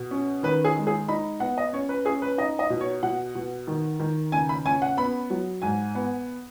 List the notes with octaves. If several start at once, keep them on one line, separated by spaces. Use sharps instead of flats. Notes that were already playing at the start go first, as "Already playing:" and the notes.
Already playing: B2
C#4
D#3 B4
G#4
G#3
G#4
D#4 B5
B3 F#5
D#5
C#4 C#5
B4
C#4 G#4
B4
D#4 D#5
D#5
B2
C#5
B2 F#5
B2
D#3
D#3
C#3 G#5
B5
C#4 G#5
F#5
B3 B5
F#3
G#2 G#5
B3